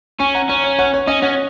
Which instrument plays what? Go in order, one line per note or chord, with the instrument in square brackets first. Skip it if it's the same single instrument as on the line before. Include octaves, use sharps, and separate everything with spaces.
[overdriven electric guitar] C#4 [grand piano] G#5 C#6
[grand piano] F#5 A#5
[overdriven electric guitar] C#4 [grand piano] C#5
[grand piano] C#5
C#5 F#5
C#5
[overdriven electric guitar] C#4 [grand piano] D#5
[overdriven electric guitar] C#4 [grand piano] C#5 F#5